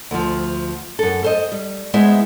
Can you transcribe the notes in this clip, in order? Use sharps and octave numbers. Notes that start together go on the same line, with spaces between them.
D2 F3
F#2 A4
A4 C5 D#5
G3
G#3 B3 E4 C5 E5